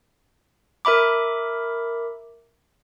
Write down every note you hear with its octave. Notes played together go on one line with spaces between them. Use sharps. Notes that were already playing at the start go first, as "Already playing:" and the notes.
A#4 E5 B5 D6